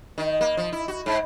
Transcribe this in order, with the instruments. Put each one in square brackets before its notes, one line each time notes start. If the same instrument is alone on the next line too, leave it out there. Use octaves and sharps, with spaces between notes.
[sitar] D#3
A#3
F3
E4
F#4
G#2